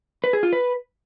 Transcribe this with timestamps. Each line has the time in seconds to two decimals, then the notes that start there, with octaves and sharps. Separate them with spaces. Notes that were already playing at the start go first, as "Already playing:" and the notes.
0.24 B4
0.33 G#4
0.43 F4
0.53 B4